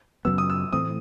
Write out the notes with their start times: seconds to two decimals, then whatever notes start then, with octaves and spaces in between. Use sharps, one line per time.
0.25 F#2 C#3 F#3 B3 E6
0.38 D#6
0.50 E6
0.73 A2 E3 A3 C4 D#6